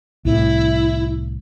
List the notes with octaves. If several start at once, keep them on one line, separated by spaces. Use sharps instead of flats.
C2 A2 E4